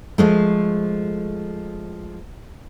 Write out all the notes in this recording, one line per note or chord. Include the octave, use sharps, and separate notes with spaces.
F3 G#3 A3